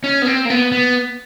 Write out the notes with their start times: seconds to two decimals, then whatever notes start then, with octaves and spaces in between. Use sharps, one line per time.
0.04 C#4
0.22 B3
0.26 C4
0.45 A#3
0.50 B3
0.72 B3